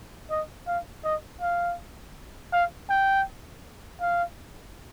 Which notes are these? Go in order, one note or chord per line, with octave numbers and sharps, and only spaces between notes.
D#5
F5
D#5
F5
F5
G5
F5